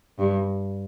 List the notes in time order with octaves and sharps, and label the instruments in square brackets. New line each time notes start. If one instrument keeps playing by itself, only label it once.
[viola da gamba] G2